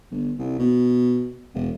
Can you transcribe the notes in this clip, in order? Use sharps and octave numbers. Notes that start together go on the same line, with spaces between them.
G1
C2
B2
E1